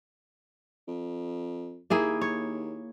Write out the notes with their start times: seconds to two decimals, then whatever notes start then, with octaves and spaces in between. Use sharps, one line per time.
0.88 F2
1.90 D#2 A#3 E4 G#4
2.21 C#5